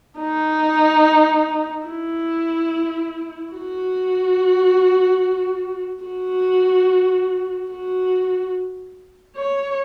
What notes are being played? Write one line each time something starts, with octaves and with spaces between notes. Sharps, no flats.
D#4
E4
F#4
F#4
F#4
C#5